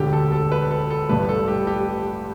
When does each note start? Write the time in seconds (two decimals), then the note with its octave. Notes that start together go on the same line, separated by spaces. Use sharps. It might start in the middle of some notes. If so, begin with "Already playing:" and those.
Already playing: E1 D2 D3 G4
0.13 A4
0.32 A4
0.52 B4
0.71 A4
0.90 A4
1.09 A1 G2 G3 B4
1.29 A4
1.48 G4
1.67 G4